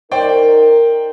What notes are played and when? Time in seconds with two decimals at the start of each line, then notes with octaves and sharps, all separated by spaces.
0.12 D#4 A#4 C5 D5 G5